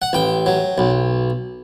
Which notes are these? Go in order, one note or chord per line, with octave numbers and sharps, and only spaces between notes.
F#5
A1 G5
F#3
B1